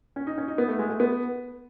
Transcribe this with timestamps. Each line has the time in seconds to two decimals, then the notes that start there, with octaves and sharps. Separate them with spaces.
0.16 C#4
0.27 D#4
0.38 C#4
0.48 D#4
0.58 B3
0.69 A3
0.79 G#3
0.90 A3
1.00 B3